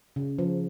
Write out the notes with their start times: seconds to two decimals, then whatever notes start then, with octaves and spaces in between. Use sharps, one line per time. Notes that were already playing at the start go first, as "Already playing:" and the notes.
0.16 C#3
0.39 F3